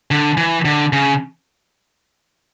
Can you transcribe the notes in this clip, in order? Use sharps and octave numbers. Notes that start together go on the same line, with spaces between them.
D3
E3
D3
C#3